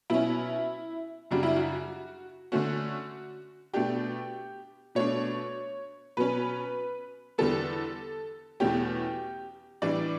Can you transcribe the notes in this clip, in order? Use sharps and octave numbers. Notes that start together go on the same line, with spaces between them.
B2 F#3 C#4 E4
F#2 C#3 G3 D4 F#4
E4
F#4
D3 A3 C#4 F#4
B2 A3 D4 G4
B2 A3 D4 C#5
B2 F#3 C#4 B4
E2 D3 G3 B3 A4
E2 B2 A3 C#4 G4
A2 E3 G3 D4 D5